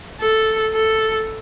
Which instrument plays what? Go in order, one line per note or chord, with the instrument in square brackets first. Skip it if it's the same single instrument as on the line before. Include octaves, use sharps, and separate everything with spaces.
[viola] A4
A4